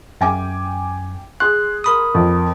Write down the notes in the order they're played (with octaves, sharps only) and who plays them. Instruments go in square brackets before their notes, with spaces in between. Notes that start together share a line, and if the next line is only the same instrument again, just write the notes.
[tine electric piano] F#2 [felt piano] G5 G#5 D6
[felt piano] G#4 C6 [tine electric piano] F#6
[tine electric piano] A#4 B5 D#6
[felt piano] F2